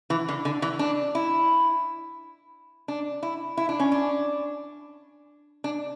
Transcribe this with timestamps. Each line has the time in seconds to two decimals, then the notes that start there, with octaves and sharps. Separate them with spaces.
0.10 E3
0.29 D3
0.45 D3
0.62 E3
0.79 D4
1.15 E4
2.88 D4
3.23 E4
3.57 E4
3.69 D4
3.79 C#4
3.92 D4
5.64 D4